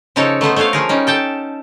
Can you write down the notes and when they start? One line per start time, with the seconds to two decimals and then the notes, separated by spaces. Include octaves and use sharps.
0.16 C#3 F3 D#4 A4 A#4 C#5
0.41 A3 B3 D#4 C5
0.56 A3 D4 C5 C#5 F5
0.73 F3 G#4 A#4
0.89 G3 C#4 D#4
1.07 A4 G5 A5